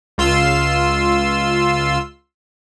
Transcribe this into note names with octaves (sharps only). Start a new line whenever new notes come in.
C#2 F4 C6 E6